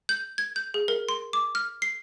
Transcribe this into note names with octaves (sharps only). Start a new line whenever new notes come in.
G6
G#6
G6
G#4
A#4
C6
D6
F6
C7